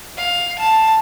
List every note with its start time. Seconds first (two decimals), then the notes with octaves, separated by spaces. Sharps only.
0.17 F5
0.59 A5